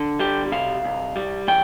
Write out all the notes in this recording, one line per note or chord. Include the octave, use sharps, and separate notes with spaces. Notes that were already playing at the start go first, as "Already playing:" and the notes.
Already playing: D3
G3 G4
C3 F5
C2
G3
E3 G5